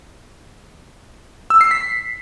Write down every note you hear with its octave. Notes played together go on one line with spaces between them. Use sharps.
E6
C7
B6